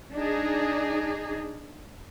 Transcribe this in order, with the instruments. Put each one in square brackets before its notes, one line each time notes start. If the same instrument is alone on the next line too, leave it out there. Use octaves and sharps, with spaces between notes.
[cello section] D4 D#4 G#4